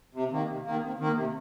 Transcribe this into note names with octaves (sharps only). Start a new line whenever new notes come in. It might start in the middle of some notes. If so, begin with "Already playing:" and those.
C3
D#3 A#3
C3
D#3 A#3
C3
D#3 A#3
C3